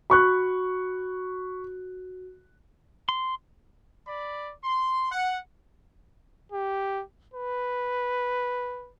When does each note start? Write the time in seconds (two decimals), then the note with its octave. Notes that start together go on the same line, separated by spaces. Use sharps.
0.10 F#4 B5 C#6 F#6
3.09 C6
4.08 D5 B5
4.64 C6
5.11 F#5
6.52 G4
7.34 B4